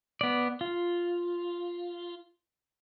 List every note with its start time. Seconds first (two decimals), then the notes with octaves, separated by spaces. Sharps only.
0.21 B3 D5
0.61 F4